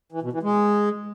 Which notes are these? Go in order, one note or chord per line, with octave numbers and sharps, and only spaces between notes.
E3
B2
E3
G#3